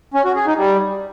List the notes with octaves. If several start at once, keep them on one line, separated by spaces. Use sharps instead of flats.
C#4
F#4
G#4
D#4
G3